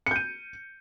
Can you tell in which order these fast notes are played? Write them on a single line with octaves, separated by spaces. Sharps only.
C#7 G6 D#7